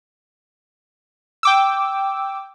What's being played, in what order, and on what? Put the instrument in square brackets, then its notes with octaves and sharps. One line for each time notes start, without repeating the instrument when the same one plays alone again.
[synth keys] G5 D6 E6